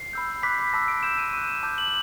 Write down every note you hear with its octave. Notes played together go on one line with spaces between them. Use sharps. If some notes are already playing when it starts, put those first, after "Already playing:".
Already playing: C7
B5 E6 G6
B5 D6 F#6 B6
B6
A5 C6 E6 A#6
D7
C6 E6 G6 E7
D#7
E7
C#6 F#6 D#7
E7
A5 D6 G6
F#7